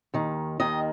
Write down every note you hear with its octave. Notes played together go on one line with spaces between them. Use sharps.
D#2 D#3
D#2 D#3 D#5